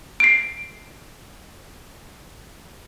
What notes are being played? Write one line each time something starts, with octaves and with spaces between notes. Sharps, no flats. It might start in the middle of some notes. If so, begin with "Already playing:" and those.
C7 D7